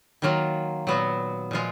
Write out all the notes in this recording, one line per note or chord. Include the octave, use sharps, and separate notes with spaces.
D#3 F#3 A#3 F4
A#2 F#3 B3 F#4
A#2 F3 G#3 F4